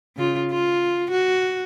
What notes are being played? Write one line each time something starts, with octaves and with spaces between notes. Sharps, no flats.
C#3 F4
F4
F#4